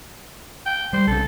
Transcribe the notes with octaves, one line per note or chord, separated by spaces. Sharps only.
G5
G3 C5
B1 C#3 A4